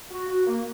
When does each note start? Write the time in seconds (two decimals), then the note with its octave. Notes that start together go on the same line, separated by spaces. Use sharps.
0.10 F#4
0.28 F#4
0.46 A#3